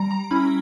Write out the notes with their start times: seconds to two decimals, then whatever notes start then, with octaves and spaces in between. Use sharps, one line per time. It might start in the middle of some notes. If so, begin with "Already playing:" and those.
Already playing: G3 A#5
0.11 A#5
0.31 C#4 E4 B5